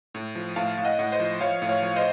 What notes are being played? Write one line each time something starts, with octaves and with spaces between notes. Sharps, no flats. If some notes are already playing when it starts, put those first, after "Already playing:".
A2
F3
A2 F5 A5
A2
D#5 F#5
A2
C5 D#5
F3
F3 C#5 F5
A2
C#5 F5
F3
C5 D#5